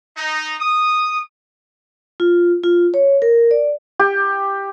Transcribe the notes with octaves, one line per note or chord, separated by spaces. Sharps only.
D#4
D#6
F4
F4
C#5
A#4
D5
G4